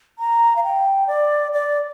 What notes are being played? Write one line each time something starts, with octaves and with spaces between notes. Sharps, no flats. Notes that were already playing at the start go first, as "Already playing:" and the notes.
A#5
F5
G5
D5
D5